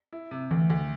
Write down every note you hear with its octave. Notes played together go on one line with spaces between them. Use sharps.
E4
C3
D2 E3
D2